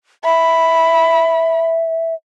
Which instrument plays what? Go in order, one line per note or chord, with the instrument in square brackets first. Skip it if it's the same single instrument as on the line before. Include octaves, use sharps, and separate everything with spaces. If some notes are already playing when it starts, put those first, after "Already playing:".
[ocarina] E5 [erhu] B5